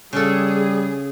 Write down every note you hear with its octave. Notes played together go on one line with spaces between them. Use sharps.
C#3 G3 G#4 A4